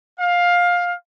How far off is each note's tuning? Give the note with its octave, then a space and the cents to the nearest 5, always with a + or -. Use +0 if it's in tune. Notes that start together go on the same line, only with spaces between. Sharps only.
F5 +15